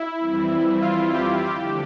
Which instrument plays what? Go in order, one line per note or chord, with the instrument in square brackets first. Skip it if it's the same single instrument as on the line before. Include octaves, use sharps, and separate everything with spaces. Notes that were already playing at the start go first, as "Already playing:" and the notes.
Already playing: [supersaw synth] E4
[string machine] F2 E3 G3 C4
[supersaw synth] F4
G4
[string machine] D3 F3 A3 D4 [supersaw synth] G4